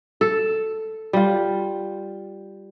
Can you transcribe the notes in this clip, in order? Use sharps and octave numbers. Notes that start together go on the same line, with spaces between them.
A4
G3 F4